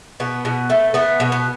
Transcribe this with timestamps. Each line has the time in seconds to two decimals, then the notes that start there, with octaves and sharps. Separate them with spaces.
0.20 B2 B3
0.45 B2
0.70 A3
0.94 A3 B3
1.20 B2
1.32 B3